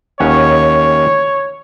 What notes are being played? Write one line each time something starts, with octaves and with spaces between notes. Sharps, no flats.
D#2 C#4 C#5 F#5